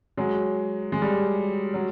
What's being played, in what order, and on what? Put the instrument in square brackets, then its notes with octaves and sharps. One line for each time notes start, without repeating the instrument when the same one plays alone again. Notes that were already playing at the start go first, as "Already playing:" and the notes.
[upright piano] F#3 G#3
G#3
G3
F#3